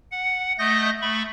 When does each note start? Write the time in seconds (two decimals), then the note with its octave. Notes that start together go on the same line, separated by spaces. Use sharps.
0.11 F#5
0.59 A3 D#5 D#6 G6 A#6
1.01 A3 B5 C#6